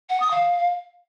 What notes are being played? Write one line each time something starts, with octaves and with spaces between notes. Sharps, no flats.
F#5
D#6
F5